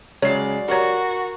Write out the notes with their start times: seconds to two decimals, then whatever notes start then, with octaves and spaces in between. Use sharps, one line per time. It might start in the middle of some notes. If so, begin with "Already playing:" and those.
0.22 C#3 F#3 G#3 C#5 D5 C7
0.68 F#4 G4 A#4 C#5 A#5